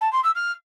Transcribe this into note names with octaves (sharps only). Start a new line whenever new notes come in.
A5
C6
E6
F6